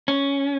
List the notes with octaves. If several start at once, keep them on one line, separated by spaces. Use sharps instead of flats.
C#4